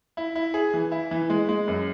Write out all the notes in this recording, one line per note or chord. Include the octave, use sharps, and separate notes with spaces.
E4
E4
G#4
E3
E4
E3
G#3
G#3
F#2